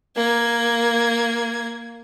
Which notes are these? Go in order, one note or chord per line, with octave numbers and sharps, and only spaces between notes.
A#3 G#6